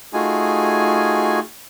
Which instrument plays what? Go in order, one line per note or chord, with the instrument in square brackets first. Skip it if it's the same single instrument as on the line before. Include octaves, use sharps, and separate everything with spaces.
[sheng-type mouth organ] A3 D#4 F4 F#4 G#4 G#5